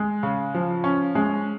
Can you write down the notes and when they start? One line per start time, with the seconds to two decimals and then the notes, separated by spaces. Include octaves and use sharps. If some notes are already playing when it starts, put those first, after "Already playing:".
Already playing: G#3
0.23 C#3
0.54 F3
0.84 C#4
1.15 G#3